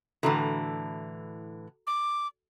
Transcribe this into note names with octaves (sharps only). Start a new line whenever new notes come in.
A2 D3 E3 F#4 A4 A#5
D6